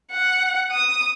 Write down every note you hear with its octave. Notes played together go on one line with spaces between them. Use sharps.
F#5
D#6